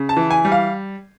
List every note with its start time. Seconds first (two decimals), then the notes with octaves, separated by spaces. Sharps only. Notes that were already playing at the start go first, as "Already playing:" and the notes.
Already playing: C#3
0.09 A5
0.17 E3
0.30 G#5
0.45 G3
0.52 F5